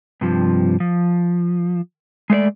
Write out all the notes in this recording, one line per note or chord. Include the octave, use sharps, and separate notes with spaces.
G2 C3 F3
F3
G#3 A3 C#5 D5